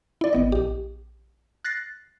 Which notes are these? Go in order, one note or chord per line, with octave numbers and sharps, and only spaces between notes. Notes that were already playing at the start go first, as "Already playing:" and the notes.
E4 D5
G#1 B3 D#5
A#1 G4
F#6 A6 A#6 C7